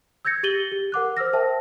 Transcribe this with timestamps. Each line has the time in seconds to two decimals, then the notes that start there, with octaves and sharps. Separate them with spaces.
0.25 E6 G6 G#6 A#6 C#7
0.43 G4 A6 D#7 F#7 G7
0.72 G4
0.92 A#4 F#5 D6 F#6
1.17 C5 E6 F6 A#6
1.33 A#4 C5 E5 G5 A5